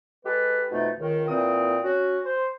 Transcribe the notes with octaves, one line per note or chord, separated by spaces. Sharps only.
G#3 G4 A4 B4
F2 B2 A3 D#4
C#2 D#3
A#2 E3 C4 D#6
C#4 F#4
C5